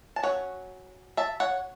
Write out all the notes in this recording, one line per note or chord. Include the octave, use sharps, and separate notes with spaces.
A5
F#3 C#4 C#5 F#5
E5 A5
C#5 F#5